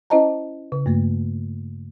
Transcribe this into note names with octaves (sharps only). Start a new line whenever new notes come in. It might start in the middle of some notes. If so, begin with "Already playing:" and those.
C#4 E4 C5 D#5 A5 A#5
C#3
G2 A3 A#3